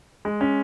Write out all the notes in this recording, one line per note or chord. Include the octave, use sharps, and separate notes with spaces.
G#3
C#4